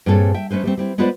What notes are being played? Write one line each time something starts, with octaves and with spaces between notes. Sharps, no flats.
G2 A#2 C4 G#4 A4 C#5
E5 G5
G3 A3 C#4 B4 C5
G3 A3 C4
G3 C4 E4
G#3 B3 F4 B4 C5 D5